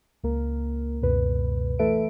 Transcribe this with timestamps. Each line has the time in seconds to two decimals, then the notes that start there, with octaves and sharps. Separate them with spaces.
0.23 C#2 A#3 A#4
1.02 C#2 F#2 B2 B4
1.79 E3 A3 A4 B4 E5 D7